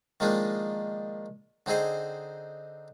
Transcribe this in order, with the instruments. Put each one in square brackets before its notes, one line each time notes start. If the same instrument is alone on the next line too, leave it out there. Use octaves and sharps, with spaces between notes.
[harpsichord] D#3 F3 G#3 A#3 D4 D#4
D3 C4 D#4 G#4 C5